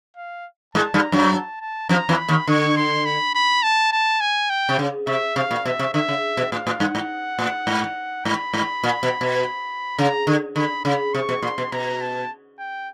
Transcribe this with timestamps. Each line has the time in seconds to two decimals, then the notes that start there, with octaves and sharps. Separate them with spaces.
0.17 F5
0.75 G#2 G#3 A5
0.94 G2 G3
1.03 A#5
1.12 F#2 F#3
1.33 A5
1.61 A5
1.89 F2 F3 A#5
2.09 E2 E3
2.18 B5
2.28 D#2 D#3
2.48 D3 C#6
2.77 C6
3.05 B5
3.35 B5
3.63 A5
3.92 A5
4.21 G#5
4.50 G5
4.69 C3
4.79 C#3
5.07 C3 E5
5.36 C3 F5
5.51 A#2
5.65 B2 E5
5.79 C3
5.94 D3 E5
6.08 C#3
6.37 B2
6.52 A2 F5
6.67 A2
6.80 G2 F#5
6.95 G#2
7.39 A2
7.67 G#2
8.25 G#2 B5
8.54 G#2
8.84 A#2
9.03 B2
9.21 B2
9.99 C#3 A#5
10.27 D3
10.56 D3 B5
10.85 C#3 B5
11.14 C3 C#6
11.29 B2
11.42 A#2 C6
11.58 B2
11.72 B2 A#5
12.01 A5
12.59 G5